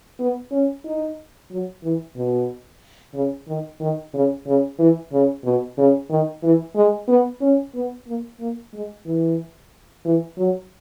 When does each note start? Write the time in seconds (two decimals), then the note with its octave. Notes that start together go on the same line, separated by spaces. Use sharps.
0.20 B3
0.51 C#4
0.85 D#4
1.51 F#3
1.83 E3
2.16 B2
3.14 C#3
3.48 D#3
3.80 D#3
4.14 C#3
4.47 C#3
4.79 E3
5.12 C#3
5.44 B2
5.78 C#3
6.10 D#3
6.43 E3
6.75 G#3
7.08 B3
7.41 C#4
7.75 B3
8.07 A#3
8.40 A#3
8.73 G#3
9.06 E3
10.05 E3
10.37 F#3